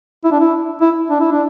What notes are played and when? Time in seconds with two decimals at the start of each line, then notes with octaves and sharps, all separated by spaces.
0.24 E4
0.32 D4
0.40 E4
0.81 E4
1.10 D4
1.21 E4
1.32 D4